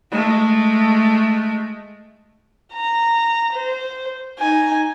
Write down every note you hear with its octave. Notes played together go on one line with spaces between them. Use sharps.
G#3 A3
A#5
C5
D#4 G#5